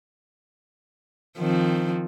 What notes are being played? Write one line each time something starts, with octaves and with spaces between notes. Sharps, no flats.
D#3 F3 C4